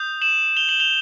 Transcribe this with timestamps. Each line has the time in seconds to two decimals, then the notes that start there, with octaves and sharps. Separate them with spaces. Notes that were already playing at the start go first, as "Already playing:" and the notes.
Already playing: D#6 G6
0.21 E7 F#7
0.57 F7 G7
0.69 E7 F#7
0.80 F7 G7